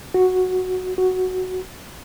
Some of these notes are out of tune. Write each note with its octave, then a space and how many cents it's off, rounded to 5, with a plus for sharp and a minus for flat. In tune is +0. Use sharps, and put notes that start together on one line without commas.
F#4 -5
F#4 +0